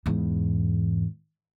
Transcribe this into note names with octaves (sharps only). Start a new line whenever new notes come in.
E2 G#2